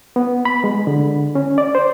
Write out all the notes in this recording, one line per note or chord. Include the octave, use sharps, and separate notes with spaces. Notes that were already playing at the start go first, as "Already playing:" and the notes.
B3
B5
G#3
D3
C#4
D5
C5